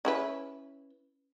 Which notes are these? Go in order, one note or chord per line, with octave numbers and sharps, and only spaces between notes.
C#4 E4 B4